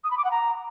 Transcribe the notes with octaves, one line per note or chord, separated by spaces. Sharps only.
D#6
B5
D6
F#5
A#5